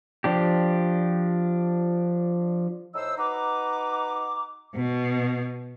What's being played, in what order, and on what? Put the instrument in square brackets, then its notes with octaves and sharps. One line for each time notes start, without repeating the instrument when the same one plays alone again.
[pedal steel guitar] F3 D4 G4
[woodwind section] A2 D#4 C5 E6
D#4 F#4 B4 A#5 D6
[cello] B2